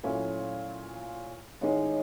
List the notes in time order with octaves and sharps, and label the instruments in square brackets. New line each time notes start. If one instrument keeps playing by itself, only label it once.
[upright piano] A#2 F#3 A3 C#4 E4
[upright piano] A1 G#2 D#3 G#3 [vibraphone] C#5 D#5